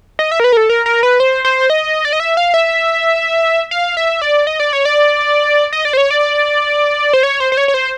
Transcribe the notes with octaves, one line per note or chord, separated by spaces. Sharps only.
D#5
E5
A#4
B4
A#4
A4
A#4
A#4
B4
C5
C5
D#5
D5
D#5
E5
F5
E5
F5
E5
D5
D#5
D5
C#5
D5
D#5
D5
C5
C#5
D5
C5
C#5
C5
C5
C#5
C#5
C5